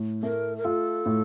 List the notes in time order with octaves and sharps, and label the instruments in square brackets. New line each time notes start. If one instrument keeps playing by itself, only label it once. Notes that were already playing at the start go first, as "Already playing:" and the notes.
Already playing: [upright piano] A2
[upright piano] A3 [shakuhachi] A#4
[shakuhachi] A#4
[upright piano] F4 [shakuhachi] A4
[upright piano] A2